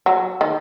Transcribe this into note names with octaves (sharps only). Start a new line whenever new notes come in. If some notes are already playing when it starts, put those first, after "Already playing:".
F#3
D#3